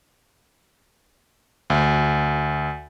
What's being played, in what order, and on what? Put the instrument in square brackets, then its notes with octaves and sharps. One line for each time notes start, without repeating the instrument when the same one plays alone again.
[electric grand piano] D2